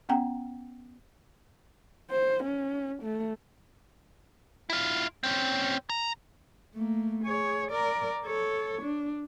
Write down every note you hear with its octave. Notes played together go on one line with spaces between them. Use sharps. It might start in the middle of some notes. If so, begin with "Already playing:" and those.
B3 C#4 F#5 G5 A#5
C5
C#4
A3
E4 F4
C4 C#4
A#5
A3 A#3
G#4 C#5
A#4 D5
A4 C#5
D4